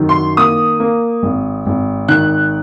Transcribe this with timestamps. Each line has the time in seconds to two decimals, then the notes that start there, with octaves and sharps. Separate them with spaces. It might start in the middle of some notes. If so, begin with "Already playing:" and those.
Already playing: F#2 D#3
0.09 C6
0.37 A#3 D#6
0.80 A#3
1.23 G#1
1.66 G#1
2.08 D#3 F#6